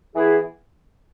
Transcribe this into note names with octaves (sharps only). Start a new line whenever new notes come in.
E3 B3 E4 G#4